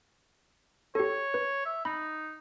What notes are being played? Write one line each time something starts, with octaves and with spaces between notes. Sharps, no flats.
G4 A4 C#5
B4
E5
D#4 B5